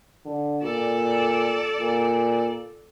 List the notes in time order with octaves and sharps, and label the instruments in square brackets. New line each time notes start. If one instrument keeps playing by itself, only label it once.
[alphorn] D3
[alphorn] A#2 [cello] A4 D5
[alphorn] A#2